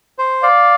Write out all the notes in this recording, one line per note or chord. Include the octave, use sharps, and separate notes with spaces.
C5
D5 F5